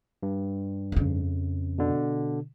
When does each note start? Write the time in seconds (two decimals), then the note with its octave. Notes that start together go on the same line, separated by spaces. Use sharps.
0.23 G2
0.92 F2 C#3
1.78 B2 D3